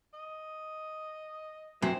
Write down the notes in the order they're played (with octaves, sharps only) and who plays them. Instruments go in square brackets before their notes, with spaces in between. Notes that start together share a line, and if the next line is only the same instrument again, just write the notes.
[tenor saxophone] D#5
[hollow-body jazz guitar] F#2 [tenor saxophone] E3 [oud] C4